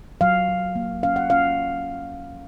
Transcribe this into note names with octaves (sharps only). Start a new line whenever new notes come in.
F#3 F5
F#3
A#3
C#4 F5
F#5
C#4 F5